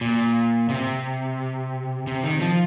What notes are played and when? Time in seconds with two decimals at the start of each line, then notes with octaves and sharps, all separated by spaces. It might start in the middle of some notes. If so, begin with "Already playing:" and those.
0.01 A#2
0.69 C3
2.07 C3
2.24 D#3
2.41 F3